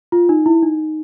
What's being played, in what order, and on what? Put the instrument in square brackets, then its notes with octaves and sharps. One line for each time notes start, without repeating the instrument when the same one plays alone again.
[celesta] F4
D#4
E4
D#4